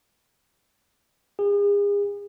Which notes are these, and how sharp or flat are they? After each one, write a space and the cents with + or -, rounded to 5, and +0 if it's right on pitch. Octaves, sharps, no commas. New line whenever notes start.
G#4 -40